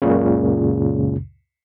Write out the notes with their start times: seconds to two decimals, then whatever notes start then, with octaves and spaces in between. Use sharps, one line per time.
0.02 C#2 F#2 A#2 C#3